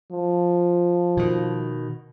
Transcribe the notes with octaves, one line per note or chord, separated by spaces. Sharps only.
F3
B2 D#3